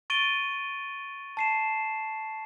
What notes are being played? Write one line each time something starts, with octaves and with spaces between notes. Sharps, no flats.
C#6 A6 D7 D#7 G7
A5 C7 E7